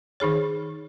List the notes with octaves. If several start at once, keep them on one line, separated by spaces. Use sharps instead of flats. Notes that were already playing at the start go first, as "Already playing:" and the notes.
D#3 D#4 G#4 C#5